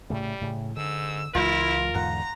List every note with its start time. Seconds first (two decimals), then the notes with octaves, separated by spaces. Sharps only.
0.10 A2 C#3 G3 A3
0.41 A2 C#3
0.77 G#2 D3 E6
1.35 C#2 E3 G#3 E4 F4 A#4
1.95 E2 G#2 D3 F#5 A#5